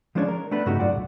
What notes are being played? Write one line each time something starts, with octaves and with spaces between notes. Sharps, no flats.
F3 G#3 C#4 D4 B4 C#5
A#4
A3 B3 D4 B4
G2 C#3 A3 D#4 F#4
G2 F#3 F4 D5 F#5
B1 F#2